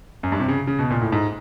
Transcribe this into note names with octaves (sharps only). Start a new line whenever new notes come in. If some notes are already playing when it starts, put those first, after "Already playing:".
F#2
G2
C3
C#3
C#3
B2
A#2
A2
G#2